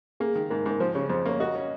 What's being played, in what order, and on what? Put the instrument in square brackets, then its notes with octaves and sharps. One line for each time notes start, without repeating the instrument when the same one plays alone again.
[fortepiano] A#3 [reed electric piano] G#4
[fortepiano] D#3
[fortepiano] G#2 [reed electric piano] A#4
[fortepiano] G#2
[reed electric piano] A#4
[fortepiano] F3 [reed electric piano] C5
[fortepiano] C#3 [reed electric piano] C#5
[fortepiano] F2 [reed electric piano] C5
[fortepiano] A#3 [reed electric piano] C#5
[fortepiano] F#4 [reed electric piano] D#5
[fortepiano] C#4